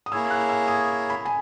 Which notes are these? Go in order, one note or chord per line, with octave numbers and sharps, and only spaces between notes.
D#6
A#3 E4 G#4 C#5 E6
F#6
E6
D#6
B5
G#5